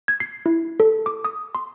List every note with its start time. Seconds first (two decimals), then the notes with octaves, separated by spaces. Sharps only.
0.08 G#6
0.20 C7
0.46 E4
0.80 A4
1.06 D6
1.25 D#6
1.55 C6